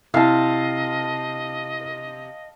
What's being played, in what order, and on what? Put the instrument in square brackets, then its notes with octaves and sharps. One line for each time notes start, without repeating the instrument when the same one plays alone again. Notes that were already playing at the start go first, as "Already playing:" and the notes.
[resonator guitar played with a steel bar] C3 [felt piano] E4 [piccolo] D#5 [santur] F5 A5